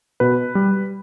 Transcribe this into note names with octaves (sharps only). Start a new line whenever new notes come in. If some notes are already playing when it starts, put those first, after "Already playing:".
B2 B4
G3